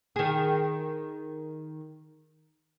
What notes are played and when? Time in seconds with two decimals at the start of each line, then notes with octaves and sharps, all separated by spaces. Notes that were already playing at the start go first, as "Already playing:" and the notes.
0.16 D#3 G#4